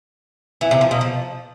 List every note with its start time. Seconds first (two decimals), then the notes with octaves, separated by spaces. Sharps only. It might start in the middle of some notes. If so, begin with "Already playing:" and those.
0.61 E3
0.71 C3
0.81 F3
0.91 B2
1.01 F3